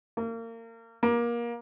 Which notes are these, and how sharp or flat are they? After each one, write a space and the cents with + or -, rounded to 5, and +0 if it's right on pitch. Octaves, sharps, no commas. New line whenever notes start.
A#3 -30
A#3 +25